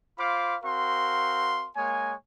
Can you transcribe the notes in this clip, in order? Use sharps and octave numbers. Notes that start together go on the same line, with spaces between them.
F4 C5 F5 B5 D6
C4 F#4 A#4 F5 C6
G#3 A#3 C#5 G#5